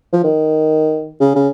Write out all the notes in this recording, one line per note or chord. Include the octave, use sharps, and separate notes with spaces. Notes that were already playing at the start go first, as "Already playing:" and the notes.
F3
D#3
C#3
C#3